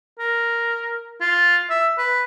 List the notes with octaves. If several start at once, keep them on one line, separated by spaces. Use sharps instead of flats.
A#4
F4
E5
B4